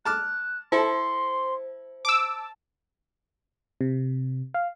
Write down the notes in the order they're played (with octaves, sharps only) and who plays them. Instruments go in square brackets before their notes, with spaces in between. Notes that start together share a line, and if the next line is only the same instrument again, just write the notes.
[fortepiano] A5 D6 F6 [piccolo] F#6
[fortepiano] E4 A4 [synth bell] C5 [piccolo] C6
[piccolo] A5 [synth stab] D6 E6
[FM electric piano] C3
F5